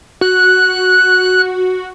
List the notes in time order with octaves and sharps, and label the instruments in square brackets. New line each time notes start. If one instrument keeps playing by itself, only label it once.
[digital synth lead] F#4 [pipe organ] F#6